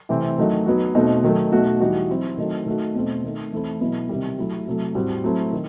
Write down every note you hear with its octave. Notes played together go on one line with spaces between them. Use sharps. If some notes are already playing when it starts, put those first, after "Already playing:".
C3 E3 A3 C4
D#3 F#3 A3 D#4 F#4
F#3 B3 D#4 F#4
B2 A3 C4 D#4 F#4
D#3 F#3 A3
B2 A3 D#4 F#4
E3 G3 D#4 F#4
F#3 C4 E4
D#3 F#3 A3 C4 D#4
D#3 A3 D#4 F#4
B2 A3 C4
D#3 A3 D#4
E3 A3 C4 E4
B2 F#3 B3 E4
C3 D#3 G3
F#3 A3 E4
C3 F#3 A3
A2 G3 C4 F#4
F#3 A3 C4 E4
D#3